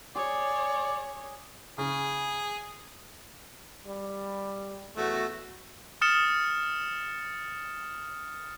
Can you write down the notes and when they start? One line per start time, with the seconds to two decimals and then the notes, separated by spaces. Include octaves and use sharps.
0.16 G#4 C#5 D5
1.78 C#3 G#4
3.87 G3
4.97 E2 A3 F#4
6.01 D#6 F6 A6 C#7 E7 G7